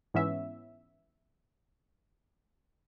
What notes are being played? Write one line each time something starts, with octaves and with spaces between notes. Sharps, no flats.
G#2 E3 B3 C#4 E5